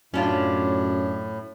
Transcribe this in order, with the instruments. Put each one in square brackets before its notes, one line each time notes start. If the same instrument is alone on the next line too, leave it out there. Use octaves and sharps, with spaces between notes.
[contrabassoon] F#2 [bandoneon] A2 [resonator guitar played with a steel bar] C#4 D4 F4